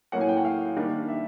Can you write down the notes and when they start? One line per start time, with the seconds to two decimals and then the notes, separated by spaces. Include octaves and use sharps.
0.12 A2 F#3 A#3 C#4 F#5
0.21 G#5
0.29 G5
0.37 F#5
0.45 F5
0.76 D#3 G3 A#3 D4
1.08 E5